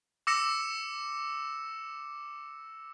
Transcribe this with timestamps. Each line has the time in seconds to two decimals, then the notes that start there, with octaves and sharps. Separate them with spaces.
0.27 D6 E6 A#6 C#7 E7